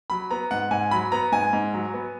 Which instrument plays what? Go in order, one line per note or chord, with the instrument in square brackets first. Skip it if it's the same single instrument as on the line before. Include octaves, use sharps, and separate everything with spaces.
[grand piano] F#3 B5
B3 A#5
G#2 F#5
G#2 G#5
F#3 B5
B3 A#5
G#2 G#5
G#2
F#3
B3